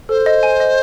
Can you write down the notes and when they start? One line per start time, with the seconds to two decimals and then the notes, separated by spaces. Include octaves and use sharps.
0.09 A4 C5
0.26 D#5
0.43 G#5
0.60 D#5